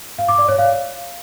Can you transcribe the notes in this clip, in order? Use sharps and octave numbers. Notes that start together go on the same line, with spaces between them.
F5
D6
D5
C#5
F5